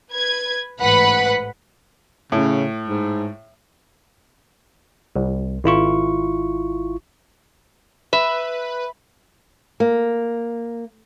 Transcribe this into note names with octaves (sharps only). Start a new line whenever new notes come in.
B4 G#6
A1 G#2 B4 F#5 B5
A2 C#3
G#2
C2
G#1 E4 F4 C#6
B4 E5 B5
A#3